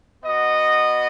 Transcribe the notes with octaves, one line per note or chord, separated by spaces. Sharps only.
B3 F#4 D#5